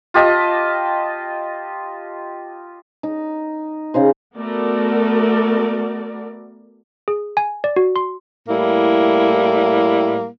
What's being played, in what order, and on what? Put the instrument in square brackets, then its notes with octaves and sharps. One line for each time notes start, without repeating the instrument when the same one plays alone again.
[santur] F4 G4 D#5 A5
[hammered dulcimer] D#4
C#3 D#4 C5
[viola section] A3 B3 F#4 A#4 D5
[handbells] G#4
G#5
D5
F#4
C6
[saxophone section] A2 G3 A#3 E4